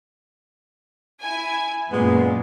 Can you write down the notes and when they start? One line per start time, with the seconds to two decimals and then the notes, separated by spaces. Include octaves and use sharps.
1.21 E4 G#5
1.91 F#2 A#2 G#3 B3